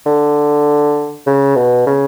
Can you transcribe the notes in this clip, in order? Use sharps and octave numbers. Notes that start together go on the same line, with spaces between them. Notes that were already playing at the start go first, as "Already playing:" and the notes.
D3
C#3
B2
C#3